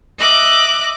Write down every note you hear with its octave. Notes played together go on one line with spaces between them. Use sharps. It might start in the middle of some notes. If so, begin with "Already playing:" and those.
D#5 E5 D6 F#6